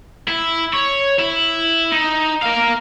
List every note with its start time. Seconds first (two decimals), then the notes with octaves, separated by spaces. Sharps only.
0.28 E4
0.73 C#5
1.19 E4
1.92 D#4
2.42 A#4 F5